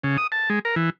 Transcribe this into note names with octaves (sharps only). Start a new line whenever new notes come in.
C#3
D#6
A5
G#3
A#4
E3